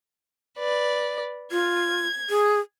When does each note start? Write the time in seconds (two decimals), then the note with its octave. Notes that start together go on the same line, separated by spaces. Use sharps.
0.58 B4 D5
1.52 F4 G#6
2.30 G#4